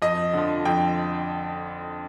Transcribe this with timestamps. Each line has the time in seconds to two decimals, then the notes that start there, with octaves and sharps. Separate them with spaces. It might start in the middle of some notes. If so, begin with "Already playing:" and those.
0.02 F2 D#5
0.33 D3 F3
0.65 F2 G5